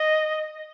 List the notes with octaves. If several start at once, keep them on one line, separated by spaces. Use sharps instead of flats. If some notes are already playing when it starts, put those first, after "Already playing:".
Already playing: D#5